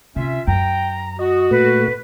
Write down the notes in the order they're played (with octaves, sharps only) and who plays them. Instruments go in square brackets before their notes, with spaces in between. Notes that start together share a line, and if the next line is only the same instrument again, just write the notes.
[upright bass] C3 [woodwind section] C#4 F4 E5
[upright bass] F#2 [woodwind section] G5 [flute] A#5
[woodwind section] F#4 [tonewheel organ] D#5
[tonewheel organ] A#2 A3 [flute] B4